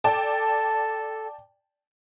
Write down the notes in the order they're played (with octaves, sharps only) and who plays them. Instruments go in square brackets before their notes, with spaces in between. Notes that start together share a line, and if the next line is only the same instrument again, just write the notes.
[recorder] A4 [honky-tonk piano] D5 G5 A5